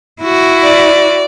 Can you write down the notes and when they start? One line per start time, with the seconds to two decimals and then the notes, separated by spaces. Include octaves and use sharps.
0.21 E4 F#4
0.63 D5